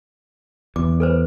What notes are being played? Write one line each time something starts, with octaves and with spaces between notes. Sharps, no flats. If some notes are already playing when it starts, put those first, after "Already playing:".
E2 D6
A4 B4 C5